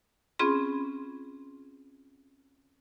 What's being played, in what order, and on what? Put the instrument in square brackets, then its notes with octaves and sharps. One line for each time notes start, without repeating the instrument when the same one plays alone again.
[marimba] C4 C#4 F4 G#4 B5 C6